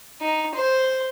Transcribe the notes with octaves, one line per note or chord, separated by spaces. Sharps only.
D#4
C5